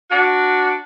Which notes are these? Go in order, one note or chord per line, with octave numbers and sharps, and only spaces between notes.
D4 F#4